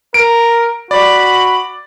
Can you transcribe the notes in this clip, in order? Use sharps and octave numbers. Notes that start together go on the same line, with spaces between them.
A#4 D7
F#4 D5 B5